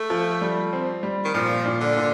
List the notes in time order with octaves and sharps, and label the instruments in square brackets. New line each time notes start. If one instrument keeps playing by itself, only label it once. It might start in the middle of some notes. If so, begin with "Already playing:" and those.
Already playing: [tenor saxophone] A3
[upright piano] F3
G3
C4
G3
[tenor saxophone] D#3
[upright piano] A#2 [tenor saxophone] F3
[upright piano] A#2
[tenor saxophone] D3
[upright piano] A#2